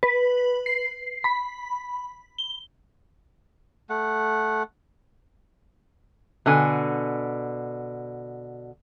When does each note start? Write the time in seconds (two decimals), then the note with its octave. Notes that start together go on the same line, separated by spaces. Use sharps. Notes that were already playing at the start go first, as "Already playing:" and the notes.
0.03 B4
0.66 C7
1.24 B5
2.38 G7
3.90 A3 F#5
6.46 B2 D3 G#5